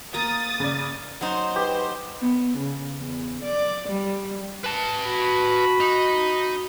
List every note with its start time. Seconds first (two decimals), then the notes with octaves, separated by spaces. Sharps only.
0.14 A#3 A#5 D#6 A6
0.60 C#3 D5
1.21 F#3 D#4 C5 C6
1.56 G4 B4
2.19 B3
2.57 C#3
2.98 E2
3.43 D5
3.88 G3
4.64 B4 A5
5.08 F#4 B5
5.80 D#4